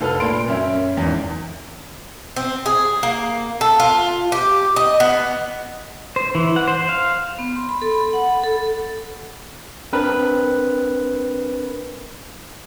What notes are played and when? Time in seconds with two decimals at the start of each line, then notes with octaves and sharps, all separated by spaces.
0.01 F1 A4 B4 F6
0.20 A#2 B5 C6 D7
0.48 F#2 C#4 E5
0.97 G#1 E2
2.36 C4
2.66 G#4
3.03 A#3
3.61 A4
3.80 F4
4.32 G4
4.76 D#5
5.00 B3
6.16 C5
6.35 E3
6.56 F#5
6.68 C5
6.89 F5
7.39 B3
7.56 C6
7.69 B5
7.82 A4
7.94 B5
8.13 F#5
8.30 B5
8.44 A4
9.93 C4 D4 A#4 B4